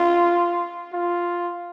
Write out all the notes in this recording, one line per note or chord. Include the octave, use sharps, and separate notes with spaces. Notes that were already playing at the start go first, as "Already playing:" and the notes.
Already playing: F4
F4